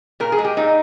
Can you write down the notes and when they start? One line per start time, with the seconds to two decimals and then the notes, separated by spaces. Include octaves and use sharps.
0.20 A#2 A#4
0.32 G#4
0.39 G#3
0.44 G4
0.57 A#2 D#4